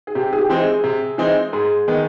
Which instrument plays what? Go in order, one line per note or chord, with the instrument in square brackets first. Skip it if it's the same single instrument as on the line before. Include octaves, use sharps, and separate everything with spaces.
[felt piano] G#4
[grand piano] C3 [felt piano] G4
[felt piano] G#4
G4
[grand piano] E3 G#3 C4 D#4
[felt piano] G#4
[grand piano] C3
E3 G#3 C4 D#4
[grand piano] G#2 [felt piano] G#4
[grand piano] D#3 G#3 B3